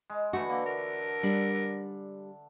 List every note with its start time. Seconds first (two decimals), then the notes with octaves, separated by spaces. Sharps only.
0.10 G#3
0.33 D3 E3 A3 F#4
0.49 D3 A#3
0.66 A#4
1.23 G3 D4